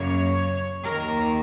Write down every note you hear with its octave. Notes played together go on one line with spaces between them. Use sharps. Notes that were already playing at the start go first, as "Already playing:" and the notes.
Already playing: F#2 C#3 F#3 A#3 C#5
D#2 D#3 A#3 A#4